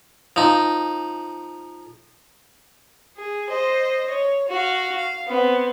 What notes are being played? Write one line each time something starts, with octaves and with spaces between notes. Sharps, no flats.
F3 D#4
G#4
C5 D#5
C#5
F#4 F5
F5
B3 C4